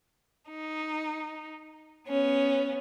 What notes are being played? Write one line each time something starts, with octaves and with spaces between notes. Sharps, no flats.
D#4
B3 C#4